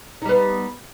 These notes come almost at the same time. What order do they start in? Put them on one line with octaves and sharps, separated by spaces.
D#4 G3 B3